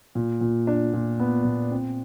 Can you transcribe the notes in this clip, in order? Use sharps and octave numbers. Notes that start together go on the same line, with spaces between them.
A#2
A#2
D4
A#2
B3
A#2
C4